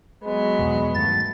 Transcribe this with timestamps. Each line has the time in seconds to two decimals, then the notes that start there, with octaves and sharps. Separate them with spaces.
0.24 F#3 G#3 B3
0.59 E2 B2
0.95 G2 D#3 A3 A6